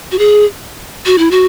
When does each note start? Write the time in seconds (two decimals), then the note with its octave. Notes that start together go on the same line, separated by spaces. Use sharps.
0.12 F#4
0.19 G#4
1.06 F#4
1.18 E4
1.31 F#4